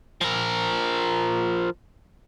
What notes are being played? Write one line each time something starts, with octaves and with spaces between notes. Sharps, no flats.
F3 A#4